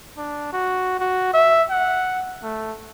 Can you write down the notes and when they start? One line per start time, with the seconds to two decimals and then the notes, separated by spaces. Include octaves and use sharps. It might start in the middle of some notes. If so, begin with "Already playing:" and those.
0.17 D4
0.52 F#4
0.99 F#4
1.33 E5
1.70 F#5
2.43 A3